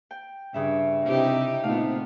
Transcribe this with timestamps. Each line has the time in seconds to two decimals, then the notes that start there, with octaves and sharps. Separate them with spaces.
0.11 G5
0.54 G2 C#3 E5
1.06 C3 D#4 E4 G4
1.63 A#2 A3 B3 C4 D#4 F4 F5